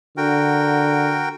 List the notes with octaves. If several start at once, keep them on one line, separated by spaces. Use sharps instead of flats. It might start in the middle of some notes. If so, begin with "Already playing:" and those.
D3 F#4 A#4 G5